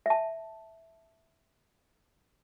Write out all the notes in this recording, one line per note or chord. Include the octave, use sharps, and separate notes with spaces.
E5 A5